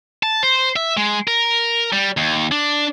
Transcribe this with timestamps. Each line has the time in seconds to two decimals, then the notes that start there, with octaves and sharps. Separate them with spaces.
0.23 A5
0.43 C5
0.76 E5
0.97 G#3
1.28 A#4
1.93 G3
2.17 D#2
2.51 D4